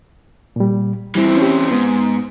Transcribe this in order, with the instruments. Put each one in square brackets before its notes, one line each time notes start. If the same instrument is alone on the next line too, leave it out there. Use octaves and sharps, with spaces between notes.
[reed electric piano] A#2 G3
[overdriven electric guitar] E3 C4 [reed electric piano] G3 E4
[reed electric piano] C#4 G4
[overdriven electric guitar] G#2 [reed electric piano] B3